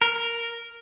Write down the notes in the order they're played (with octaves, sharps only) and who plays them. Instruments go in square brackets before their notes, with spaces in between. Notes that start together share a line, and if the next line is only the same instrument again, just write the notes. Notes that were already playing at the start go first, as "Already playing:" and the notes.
[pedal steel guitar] A#4